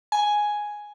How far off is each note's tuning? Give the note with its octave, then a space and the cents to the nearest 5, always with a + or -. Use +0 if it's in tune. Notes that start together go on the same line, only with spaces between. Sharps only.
G#5 +5